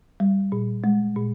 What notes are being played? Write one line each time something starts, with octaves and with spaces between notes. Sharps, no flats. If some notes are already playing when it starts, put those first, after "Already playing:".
G3
A#2
G#3
A#2